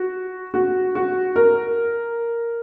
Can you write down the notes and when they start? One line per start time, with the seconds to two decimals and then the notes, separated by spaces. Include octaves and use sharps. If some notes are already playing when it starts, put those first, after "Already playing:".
Already playing: F#4
0.54 F#4
0.95 F#4
1.36 A#4